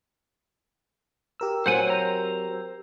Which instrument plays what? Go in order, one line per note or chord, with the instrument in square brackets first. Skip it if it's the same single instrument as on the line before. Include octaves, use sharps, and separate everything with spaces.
[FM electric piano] G4 A#4 E6
[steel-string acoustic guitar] F#3 C4 [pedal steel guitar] C5 F#5 G#5
[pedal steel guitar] C5 A#5